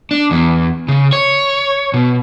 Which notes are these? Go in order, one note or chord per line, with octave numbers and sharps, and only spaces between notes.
D4
E2
C#3
C#5
B2